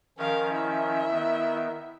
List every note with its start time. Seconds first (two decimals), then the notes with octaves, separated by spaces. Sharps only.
0.18 D#3 F3 C#4 A#4 F5
0.53 E4 E5
1.10 D#3 B3